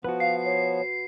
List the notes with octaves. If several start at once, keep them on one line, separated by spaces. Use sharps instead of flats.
F3 B3 F#4 B4
F5 C7
C#5